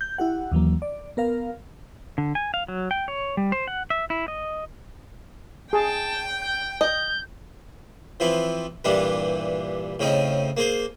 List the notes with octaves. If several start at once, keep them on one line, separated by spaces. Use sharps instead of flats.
G6
E4 G4 F#5
D#2 E3 F#3 A#3
D5
B3 A#4 F5
D3
G#5
F5
F#3
G5
C#5
G3
C5
F#5
E5
E4
D#5
G#4 G5 A5
G6
D#5 G6
E3 F3 C4 E4
G2 A#2 E3 G3 D4
A2 C#3 C4 C#4 D#4
A#3 G#4 C5